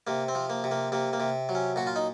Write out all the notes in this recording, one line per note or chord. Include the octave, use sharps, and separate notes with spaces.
C3 A#3
C4
F3
A#3
C3
A#3
C3 A#3
A#3
C3
F#3
C#4
A#2 F#4
F4
D#4